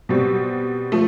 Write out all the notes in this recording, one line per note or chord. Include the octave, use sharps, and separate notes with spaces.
B2 G3 C4
F3 A3